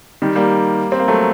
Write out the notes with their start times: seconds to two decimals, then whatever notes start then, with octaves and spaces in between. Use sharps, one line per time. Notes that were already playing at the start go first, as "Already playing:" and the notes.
0.22 D#3 G3
0.36 G3 A#3
0.92 C4
1.00 A#3
1.08 F#3 A3